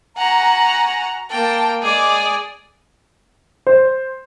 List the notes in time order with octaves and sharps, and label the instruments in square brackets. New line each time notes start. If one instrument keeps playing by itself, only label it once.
[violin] F#4 F#5 [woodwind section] G#5 A#5
[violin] A#3 G5 [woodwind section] A5
[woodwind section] G#3 D6 [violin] G#4 D5
[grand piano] C5